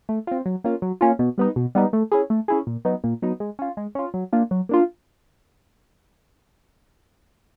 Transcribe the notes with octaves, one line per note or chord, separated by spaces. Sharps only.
A3
C4 F4
F#3
A#3 C#4 F4
F#3
A#3 C#4 F4
B2
G3 B3 D#4
B2
G3 B3 D#4
A3
C#4 E4 G#4
A3
C#4 E4 G#4
A#2
F#3 B3 D#4
A#2
F#3 B3 D#4
G#3
C#4 F4
G#3
C#4 F4
F#3
A#3 D4 F4
F#3
A#3 D4 F4